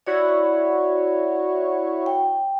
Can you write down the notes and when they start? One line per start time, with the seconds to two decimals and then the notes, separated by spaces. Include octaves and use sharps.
0.07 E4 F#4 C#5 D5
2.06 G5